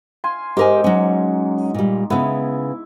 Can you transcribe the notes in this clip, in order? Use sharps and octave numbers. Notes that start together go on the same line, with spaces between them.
F5 G#5 C6
G#2 D#4 G4 A#4 G#5 D6
F#3 C#4
A#2 G3
C#3 B3 E4